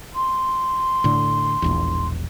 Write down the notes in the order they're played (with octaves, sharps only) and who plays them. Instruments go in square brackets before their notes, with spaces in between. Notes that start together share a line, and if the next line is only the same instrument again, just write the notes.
[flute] C6
[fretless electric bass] A2 D3
E1 A#1 E2